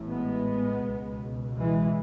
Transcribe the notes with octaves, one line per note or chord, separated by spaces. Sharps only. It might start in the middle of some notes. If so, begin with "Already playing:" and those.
Already playing: A1 A2
G#3 B3
C#2 B2
E3 G#3